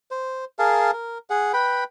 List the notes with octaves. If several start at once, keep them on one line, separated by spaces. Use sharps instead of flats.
C5
G#4 A#4 F5 A5
A#4
G#4 F#5
B4 G5 B5